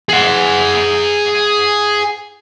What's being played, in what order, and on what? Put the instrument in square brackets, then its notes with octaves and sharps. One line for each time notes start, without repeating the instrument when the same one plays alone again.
[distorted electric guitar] G#4 F#5